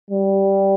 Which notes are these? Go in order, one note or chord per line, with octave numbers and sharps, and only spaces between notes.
G3